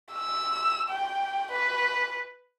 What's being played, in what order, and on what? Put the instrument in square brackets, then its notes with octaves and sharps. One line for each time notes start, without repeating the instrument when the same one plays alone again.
[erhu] E6
G5
B4